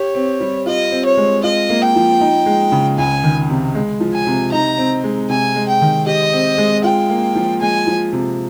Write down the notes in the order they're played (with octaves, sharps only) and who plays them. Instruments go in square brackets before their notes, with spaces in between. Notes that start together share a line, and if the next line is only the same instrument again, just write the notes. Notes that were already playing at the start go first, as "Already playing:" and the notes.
Already playing: [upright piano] G4 [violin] C#5
[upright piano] C4
G3
[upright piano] F4 [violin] D#5
[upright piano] C4
[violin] C#5
[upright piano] G#3
[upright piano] F4 [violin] D#5
[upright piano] A#3
[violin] G5
[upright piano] F3
D#4
G#3
C#3
[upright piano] C#2 [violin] G#5
[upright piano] D#3
C3
G#3
F3
[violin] G#5
[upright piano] C3
[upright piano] D#4 [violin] A#5
[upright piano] C4
G#3
[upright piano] C3 [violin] G#5
[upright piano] G#3
[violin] G5
[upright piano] D#3
[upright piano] G4 [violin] D#5
[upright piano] C4
G#3
[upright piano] F4 [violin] G5
[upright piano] A#3
F3
[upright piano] G#3 [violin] G#5
[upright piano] F3
C3